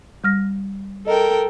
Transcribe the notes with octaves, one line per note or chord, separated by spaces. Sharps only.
G3 F6 A#6
A4 A#4 D#5 G5